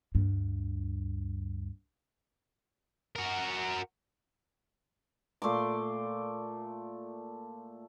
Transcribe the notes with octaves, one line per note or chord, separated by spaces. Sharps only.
D2 G2
F#4 A#4
A#2 A3 C6 D6